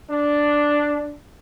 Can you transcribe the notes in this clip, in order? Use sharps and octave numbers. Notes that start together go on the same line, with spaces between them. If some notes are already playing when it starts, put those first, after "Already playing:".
D4